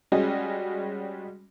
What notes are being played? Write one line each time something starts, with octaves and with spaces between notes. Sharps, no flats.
G3 G#3 C#4 F#4 D#5